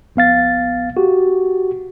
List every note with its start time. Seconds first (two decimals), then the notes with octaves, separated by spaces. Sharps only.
0.16 A#1 B3 F5 A6
0.97 F#4 G4